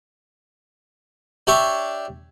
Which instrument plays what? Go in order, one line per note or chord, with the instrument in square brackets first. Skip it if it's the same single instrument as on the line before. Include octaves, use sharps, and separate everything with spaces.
[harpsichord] D4 G4 C#5 E5 C#6